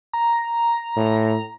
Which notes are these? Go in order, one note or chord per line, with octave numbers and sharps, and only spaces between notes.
A#5
A2